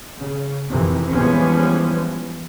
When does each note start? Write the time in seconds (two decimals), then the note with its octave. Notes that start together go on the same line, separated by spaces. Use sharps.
0.18 C#3
0.69 F2 C3 D#3 E3
1.10 E3 F3 G3 G#3 B3 C#4